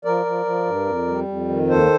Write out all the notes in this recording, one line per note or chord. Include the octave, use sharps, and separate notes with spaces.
F3 A#4 D5
F3
F3
G2
F2
G3
F2
D#3
D#2 A4 C5